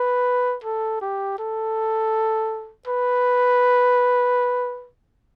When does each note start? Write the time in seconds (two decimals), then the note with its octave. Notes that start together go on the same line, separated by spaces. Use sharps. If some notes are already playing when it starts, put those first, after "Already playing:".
Already playing: B4
0.64 A4
1.02 G4
1.39 A4
2.87 B4